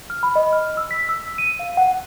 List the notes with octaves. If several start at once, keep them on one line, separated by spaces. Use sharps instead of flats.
F6
B5
D#5
F6
E6
B6
E6
D#7
F5
F#5